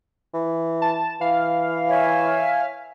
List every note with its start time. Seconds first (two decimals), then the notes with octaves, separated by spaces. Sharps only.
0.34 E3
0.82 A5
1.21 E3 F5
1.89 C#5 E5 G#5